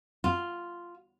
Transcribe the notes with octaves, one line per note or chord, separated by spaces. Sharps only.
F4